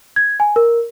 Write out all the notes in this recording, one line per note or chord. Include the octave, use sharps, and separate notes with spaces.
G#6
G#5
A#4